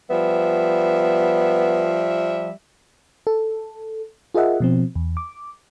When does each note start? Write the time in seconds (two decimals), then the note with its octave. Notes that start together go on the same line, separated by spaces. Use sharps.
0.10 F3 G3 B3 E5
3.27 A4
4.35 F4 G#4 A#4 D#5 E5 F#5
4.60 B2 F3 C4
4.95 E2
5.17 D6